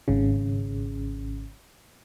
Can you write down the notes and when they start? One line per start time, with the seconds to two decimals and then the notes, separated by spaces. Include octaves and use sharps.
0.08 G#1 C#3